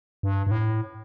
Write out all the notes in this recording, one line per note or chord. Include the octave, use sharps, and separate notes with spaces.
G2
G2
A2